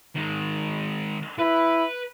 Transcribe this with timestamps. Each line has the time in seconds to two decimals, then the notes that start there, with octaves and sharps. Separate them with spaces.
0.16 D#3 G#3
1.39 E4 B4 B5